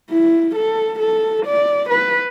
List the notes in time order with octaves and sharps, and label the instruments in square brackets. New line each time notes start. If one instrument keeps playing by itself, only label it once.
[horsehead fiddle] E4
A4
A4
D5
B4